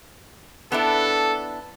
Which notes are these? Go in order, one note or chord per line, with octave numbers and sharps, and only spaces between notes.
B3 D4 E4 A4